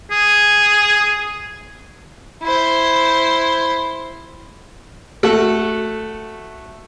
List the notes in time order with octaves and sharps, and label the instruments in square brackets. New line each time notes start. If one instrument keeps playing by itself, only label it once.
[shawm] G#4
[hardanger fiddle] E4 C5
[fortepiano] A3 F#4 A4